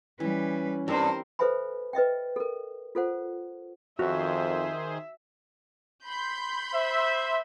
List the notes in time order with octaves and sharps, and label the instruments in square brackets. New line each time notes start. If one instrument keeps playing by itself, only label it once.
[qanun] E3 [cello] G3 B4 [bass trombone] C#4
[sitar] G2 [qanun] G3 C4 D6 [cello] A#4 C5
[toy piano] A4 B4 C5 E5 G#5 B5
B4 D#5 E5 G5
A4 A#4
F4 A4 C5 F#5
[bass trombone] F2 [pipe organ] D#3 G#4 C5 [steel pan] F#4 [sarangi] E5
[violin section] B5 C6 G6
[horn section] C5 E5